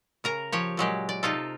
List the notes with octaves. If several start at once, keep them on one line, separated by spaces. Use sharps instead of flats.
C#3 A#4 A#5
F3 G4 C#5
A#2 F#3 G#3 G4
D5
C3 D#4 F4 A4